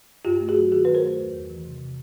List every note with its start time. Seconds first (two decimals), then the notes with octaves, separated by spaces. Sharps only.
0.25 G2 F4 G4
0.40 A3
0.48 F#4 G#4
0.56 F#3
0.72 D#3 F#4 G#4
0.85 G2 B4
0.95 A#4 C5
1.03 A3
1.18 E2
1.34 E2
1.50 E3
1.65 C3